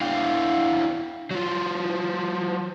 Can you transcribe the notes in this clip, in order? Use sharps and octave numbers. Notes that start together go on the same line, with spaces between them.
D4 E4 F5 G5
F#3 F4